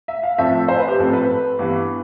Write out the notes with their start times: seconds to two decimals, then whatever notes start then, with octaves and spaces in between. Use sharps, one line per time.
0.08 E5
0.23 F5
0.38 A2 F3 A3 C4 E5
0.68 C5
0.79 B4
0.88 G4
0.99 A2 F3 C4 A4
1.09 A4
1.13 B4
1.59 G2 E3 B3